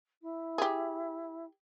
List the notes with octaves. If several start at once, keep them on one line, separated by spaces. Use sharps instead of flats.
E4
G4 G#4